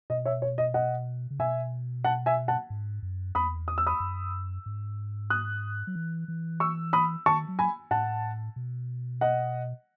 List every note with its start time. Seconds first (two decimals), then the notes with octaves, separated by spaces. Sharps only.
0.10 B2 D#5
0.25 C#5 E5
0.42 C#5
0.58 D#5
0.74 D#5 F#5
1.30 C#3
1.39 B2 E5 G#5
2.04 F#5 A5
2.26 E5 G#5
2.48 F#5 A5
2.70 G#2
3.03 F#2
3.35 E2 B5 D#6
3.68 D#6
3.78 E6
3.87 B5 D#6
4.00 F#2
4.66 G#2
5.30 D#6 F#6
5.87 F#3
5.95 E3
6.28 E3
6.60 C#6 E6
6.93 B5 D#6
7.26 D#3 A5 C#6
7.48 F#3
7.59 G#5 B5
7.91 A2 F#5 A5
8.56 B2
9.21 D#5 F#5